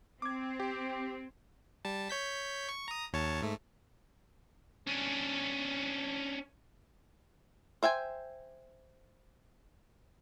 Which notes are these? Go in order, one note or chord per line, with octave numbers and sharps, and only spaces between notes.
C4 D6 G#6
G4
G3 A5
C#5 G6 B6
C#6
A#5 D#6
D#2 C#5 A5
G#2 A3
C#4 D4
C5 E5 G5 G#5